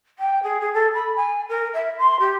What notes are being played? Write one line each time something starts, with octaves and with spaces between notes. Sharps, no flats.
G5
G#4
G#4
A4
B5
G#5
A#4
E5
C6
G4